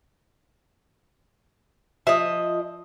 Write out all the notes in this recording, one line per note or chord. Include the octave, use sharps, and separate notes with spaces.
F3 D#5 E5